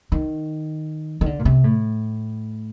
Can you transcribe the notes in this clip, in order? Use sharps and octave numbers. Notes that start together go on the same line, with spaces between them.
D#3
D#3
D3
A#2
C3
A2